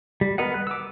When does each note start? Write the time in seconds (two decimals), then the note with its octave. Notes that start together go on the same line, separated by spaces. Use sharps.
0.21 G3
0.38 B3 A#4 D#5 F#5
0.54 F#6
0.67 D6 E6